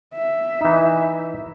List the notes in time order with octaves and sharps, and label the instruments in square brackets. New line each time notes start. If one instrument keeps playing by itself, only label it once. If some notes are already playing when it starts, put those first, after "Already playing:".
[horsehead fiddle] E5
[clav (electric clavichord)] E3 D#4